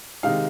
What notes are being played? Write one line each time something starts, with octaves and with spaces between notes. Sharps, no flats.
C3 D#3 G#3 D#4 F5